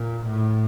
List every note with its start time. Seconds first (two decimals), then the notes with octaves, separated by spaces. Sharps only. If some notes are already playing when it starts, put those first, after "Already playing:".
Already playing: A#2
0.25 A2